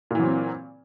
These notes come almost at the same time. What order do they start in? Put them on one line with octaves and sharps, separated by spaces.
A#2 E3 F#3 C4